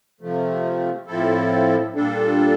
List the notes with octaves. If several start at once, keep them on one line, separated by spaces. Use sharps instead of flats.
C3 F3 A3
A2 F3 C4 E4 A4
A#2 G3 D4 A4